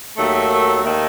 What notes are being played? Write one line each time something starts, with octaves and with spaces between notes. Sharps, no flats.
D#2 D#3 F#3 A3
D#2 D#3 A3